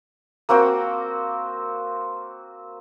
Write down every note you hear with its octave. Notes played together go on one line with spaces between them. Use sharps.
A#3 C4 F#4 G5